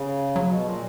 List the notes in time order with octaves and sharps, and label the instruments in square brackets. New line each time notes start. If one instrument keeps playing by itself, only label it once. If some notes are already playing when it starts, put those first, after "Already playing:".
Already playing: [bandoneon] C#3
[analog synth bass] F#3
[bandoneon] B2
A#2